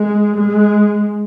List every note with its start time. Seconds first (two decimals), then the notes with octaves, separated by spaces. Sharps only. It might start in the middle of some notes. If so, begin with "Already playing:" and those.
Already playing: G#3
0.36 G#3